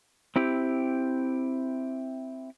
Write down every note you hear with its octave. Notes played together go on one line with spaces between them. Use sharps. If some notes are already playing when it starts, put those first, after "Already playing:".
C4 E4 G4